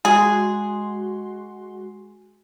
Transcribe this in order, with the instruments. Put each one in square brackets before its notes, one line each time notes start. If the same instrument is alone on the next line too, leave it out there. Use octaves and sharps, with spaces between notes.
[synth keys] G#3 F#4 C6 [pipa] G#4